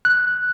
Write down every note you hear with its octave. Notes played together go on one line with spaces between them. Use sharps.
F#6